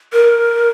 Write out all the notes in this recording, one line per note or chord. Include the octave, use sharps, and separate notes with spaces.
A#4